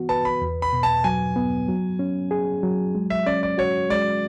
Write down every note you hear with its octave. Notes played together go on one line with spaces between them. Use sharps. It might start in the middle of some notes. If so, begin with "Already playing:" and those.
Already playing: E3 B3 F#4
B4 A5
B5
E2
B5
B2
A5
F#3 G#5
B3
F#3
C#4
G#4
F#3
G#3
E5
C#4 D5
D5
F#4 C#5
G#3 D5